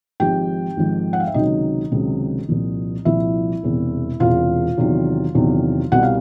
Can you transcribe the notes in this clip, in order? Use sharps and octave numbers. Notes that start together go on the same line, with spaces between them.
G#1 G#2 F3 G4 G5
G#1 G#2 F3
F#5
F5
E5
C#2 C3 D#3 F#3 D#4 D#5
C#2 C3 D#3 F#3
C2 A#2 F3
C2 A#2 F3 E4 E5
E1 E2 C3
E1 E2 C3 F4 F5
E2 C3 D#3 F#3
E2 C3 D#3 F#3
C2 B2 G3 F#5
F5